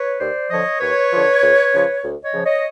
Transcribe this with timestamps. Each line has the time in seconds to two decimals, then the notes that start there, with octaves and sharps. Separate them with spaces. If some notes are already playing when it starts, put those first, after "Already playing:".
Already playing: B4 C#5
0.20 D#2 C5 D5
0.50 D3 F3 C#5 D#5
0.80 D#2 B4 C#5
1.11 D3 F3
1.42 D2
1.72 C#3 F3
2.03 D2
2.24 C#5 D#5
2.33 C#3 F3
2.44 C#5 D#5